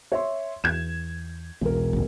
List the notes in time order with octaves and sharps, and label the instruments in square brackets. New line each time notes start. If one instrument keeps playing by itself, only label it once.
[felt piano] C#5 E5 C6
[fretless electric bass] E2 [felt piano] G#6 E7
[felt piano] E1 A#4 [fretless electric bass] B1
[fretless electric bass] A1 D2